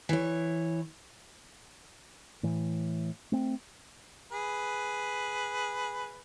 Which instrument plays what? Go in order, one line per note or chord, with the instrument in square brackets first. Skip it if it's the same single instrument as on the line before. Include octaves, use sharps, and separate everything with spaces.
[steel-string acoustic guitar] E3 C#5
[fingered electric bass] A2 E3
A3 C4
[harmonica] G#4 B4